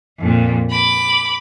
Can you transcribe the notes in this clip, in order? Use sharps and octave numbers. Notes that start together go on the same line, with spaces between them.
F2 A#2
B5 D6